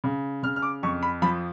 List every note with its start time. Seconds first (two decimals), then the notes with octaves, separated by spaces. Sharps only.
0.04 C#3
0.43 C#3 F6
0.56 F6
0.62 D6
0.83 F2 C#6
1.03 B5
1.22 F3 B5